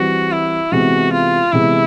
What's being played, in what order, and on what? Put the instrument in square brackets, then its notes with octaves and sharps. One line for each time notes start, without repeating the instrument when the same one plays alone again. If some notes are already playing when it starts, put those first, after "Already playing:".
Already playing: [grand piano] E3 G3 C4 [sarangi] F#4
[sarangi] E4
[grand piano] C3 E3 G#3 B3 [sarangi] F#4
[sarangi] F4
[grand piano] C3 E3 G#3 B3 [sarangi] E4